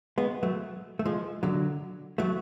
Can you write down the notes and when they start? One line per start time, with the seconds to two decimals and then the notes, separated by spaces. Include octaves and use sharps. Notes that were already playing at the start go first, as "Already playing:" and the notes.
0.18 G#3 B3
0.43 F#3 A3
0.99 A3
1.06 F3 G#3
1.43 D3 F#3
2.18 F#3 A3